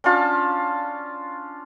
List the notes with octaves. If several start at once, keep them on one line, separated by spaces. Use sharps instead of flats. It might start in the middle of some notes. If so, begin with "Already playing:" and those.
C#4 D4 F4 A5